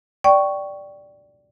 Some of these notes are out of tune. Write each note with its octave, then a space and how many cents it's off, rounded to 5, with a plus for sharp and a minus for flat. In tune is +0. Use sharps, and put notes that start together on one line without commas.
D5 +0 G5 -15 C#6 +0